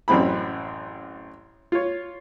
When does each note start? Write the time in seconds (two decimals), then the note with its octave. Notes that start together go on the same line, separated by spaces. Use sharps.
0.08 A1 F#2 C4 E4 B5
1.72 F4 C#5